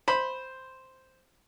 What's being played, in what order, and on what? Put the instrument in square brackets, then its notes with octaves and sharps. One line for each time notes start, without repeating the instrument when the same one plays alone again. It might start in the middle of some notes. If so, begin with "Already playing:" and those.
[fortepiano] C5 [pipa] B5